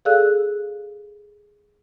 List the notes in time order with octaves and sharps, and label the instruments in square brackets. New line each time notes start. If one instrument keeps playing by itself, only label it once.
[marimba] G#4 A4 D5 F5 E6 F#6